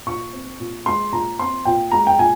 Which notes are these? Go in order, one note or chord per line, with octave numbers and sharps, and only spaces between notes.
A#2 C#6
C4
A#2
G#3 C6
A#2 A#5
C4 C6
A#2 G5
G#3 A#5
G5
A#2 G#5